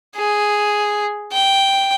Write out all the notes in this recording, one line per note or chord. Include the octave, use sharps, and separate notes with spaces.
G#4
G5